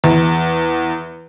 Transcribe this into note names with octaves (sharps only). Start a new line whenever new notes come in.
E2